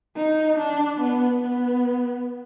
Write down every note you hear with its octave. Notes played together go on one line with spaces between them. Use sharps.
D#4
D4
B3
B3